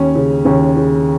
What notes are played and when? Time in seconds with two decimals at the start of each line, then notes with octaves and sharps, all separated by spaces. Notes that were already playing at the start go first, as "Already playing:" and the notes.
Already playing: D#2 C#4
0.15 C#3
0.45 D#2 C#4
0.77 C#3